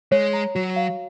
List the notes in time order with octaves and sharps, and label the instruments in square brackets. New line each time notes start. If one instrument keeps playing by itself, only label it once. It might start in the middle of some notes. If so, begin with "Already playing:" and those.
[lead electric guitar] G#3 [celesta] C#5
[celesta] A#5
[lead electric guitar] F#3 [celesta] F#4
[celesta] F5